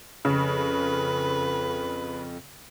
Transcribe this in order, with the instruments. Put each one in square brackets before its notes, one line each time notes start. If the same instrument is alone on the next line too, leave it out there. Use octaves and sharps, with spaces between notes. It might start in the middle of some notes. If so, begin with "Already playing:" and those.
[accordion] F2 [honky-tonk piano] C#3 [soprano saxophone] B4